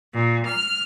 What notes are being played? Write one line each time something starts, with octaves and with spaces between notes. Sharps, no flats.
A#2
F6